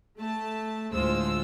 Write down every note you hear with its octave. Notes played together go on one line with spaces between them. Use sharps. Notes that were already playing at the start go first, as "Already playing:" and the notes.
A3 A5
D2 A2 G#3 F4 C5 E6